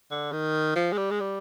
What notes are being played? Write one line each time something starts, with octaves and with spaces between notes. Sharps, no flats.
D3
D#3
F3
G#3
G3
G#3
G3